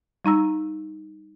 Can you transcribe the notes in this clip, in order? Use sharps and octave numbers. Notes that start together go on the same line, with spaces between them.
G3 D#4 A#5 E6